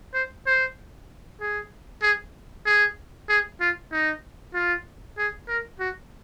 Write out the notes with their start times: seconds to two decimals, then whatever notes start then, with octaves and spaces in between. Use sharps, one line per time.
0.14 C5
0.46 C5
1.41 G#4
2.02 G#4
2.66 G#4
3.29 G#4
3.61 F4
3.92 D#4
4.54 F4
5.18 G#4
5.49 A#4
5.80 F#4